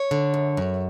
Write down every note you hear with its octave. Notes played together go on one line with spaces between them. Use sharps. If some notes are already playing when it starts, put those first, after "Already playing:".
Already playing: C#5
D3
F#2
F#2